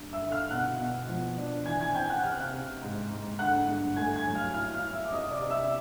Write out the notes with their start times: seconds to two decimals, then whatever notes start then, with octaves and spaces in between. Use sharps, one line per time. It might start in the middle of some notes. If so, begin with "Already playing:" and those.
Already playing: G2
0.12 E5 E6
0.21 D3
0.32 F5 F6
0.50 B2 F#5 F#6
0.79 B2
1.09 F3
1.38 D4
1.66 E3 G#5 G#6
1.81 G#5 G#6
1.95 C4 G5 G6
2.09 F#5 F#6
2.23 C3 F6
2.32 F#6
2.39 F5 F6
2.53 C3
2.82 G#2
3.11 G#2
3.39 D3 F#5 F#6
3.68 G2
3.97 A3 G#5 G#6
4.16 G#5 G#6
4.26 F#3
4.35 F5 F6
4.54 E4 F5 F6
4.73 F5 F6
4.83 E4
4.93 E5 E6
5.05 D6
5.12 C3 D#5 D#6
5.31 D5 D6
5.40 C3
5.50 E5 E6